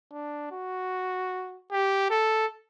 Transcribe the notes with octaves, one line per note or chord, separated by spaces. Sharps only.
D4
F#4
G4
A4